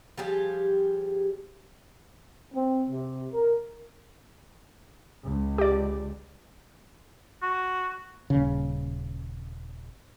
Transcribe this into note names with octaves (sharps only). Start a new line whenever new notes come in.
F3 G3 G4 G#4
C4
C3
A#4
C#2
G4 D5
F#4
D#1 C#3